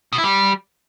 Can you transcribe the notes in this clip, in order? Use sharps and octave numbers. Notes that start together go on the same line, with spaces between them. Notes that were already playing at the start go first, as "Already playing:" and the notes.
B2
E4
G3